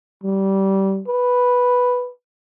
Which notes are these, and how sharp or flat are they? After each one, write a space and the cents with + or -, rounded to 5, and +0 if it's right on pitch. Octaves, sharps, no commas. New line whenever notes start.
G3 -20
B4 +0